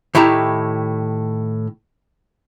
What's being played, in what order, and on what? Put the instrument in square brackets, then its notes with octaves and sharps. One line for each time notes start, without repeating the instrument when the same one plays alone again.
[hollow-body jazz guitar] A2 D#3 E4 G4 A#5